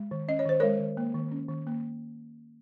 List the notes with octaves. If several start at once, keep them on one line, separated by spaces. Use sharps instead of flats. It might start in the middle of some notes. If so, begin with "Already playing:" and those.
Already playing: G#3
D#3
C#4 D#5
C#5
D#3 C5
G#3 A#4 C#5
D#3
A#3
D#3
C#4
D#3
A#3